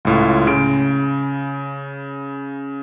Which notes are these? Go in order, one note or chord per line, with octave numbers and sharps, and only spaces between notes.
C#2 A2 F4
C#3 D7